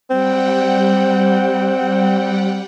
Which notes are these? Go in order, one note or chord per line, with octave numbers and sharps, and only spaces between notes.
G3 C4 F#5 G5